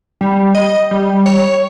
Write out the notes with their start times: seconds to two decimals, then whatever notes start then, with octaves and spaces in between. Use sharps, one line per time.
0.21 G3
0.55 D#5
0.91 G3
1.26 C#5